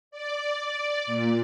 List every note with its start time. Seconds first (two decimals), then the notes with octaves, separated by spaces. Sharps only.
0.11 D5
0.64 D5
1.06 A#2